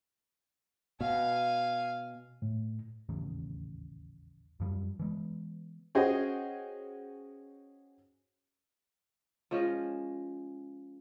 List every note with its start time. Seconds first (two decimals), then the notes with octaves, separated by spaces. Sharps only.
1.01 B2 F5 G#5
2.42 A2
3.09 D#1 A1 E2 C#3
4.60 F#2 F3 G3
5.00 E3 G#3 B3
5.95 C#4 F#4 G#4 C5 D#5 G5
9.51 F3 G#3 C#4 G#4